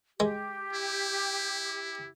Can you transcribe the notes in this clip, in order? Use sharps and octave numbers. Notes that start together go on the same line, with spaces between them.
G#3 G4
E4